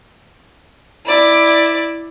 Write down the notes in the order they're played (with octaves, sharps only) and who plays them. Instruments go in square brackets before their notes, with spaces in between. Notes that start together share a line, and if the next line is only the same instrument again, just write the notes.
[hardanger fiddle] E4 D5